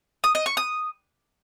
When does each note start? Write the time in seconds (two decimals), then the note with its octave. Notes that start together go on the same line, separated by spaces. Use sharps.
0.24 D#6
0.35 D#5
0.46 C#6
0.57 D#6